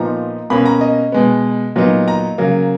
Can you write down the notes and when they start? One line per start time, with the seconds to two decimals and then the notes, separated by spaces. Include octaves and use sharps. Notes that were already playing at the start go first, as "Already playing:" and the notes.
Already playing: A#2 F3 B3 D#4 A#5
0.50 B2 A#3 C#4 B5
0.66 A#5
0.81 D#5
1.12 B2 G#3 B3
1.76 A#2 F#3 B3 D#4
2.08 A#5
2.38 C#3 F#3 A#3